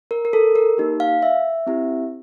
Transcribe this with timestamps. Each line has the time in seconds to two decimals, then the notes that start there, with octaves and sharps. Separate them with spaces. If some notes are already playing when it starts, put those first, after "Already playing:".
0.11 A#4
0.25 A#4
0.33 A4
0.56 A#4
0.78 A#3 D#4 G4
1.00 F5
1.23 E5
1.67 C4 E4 G4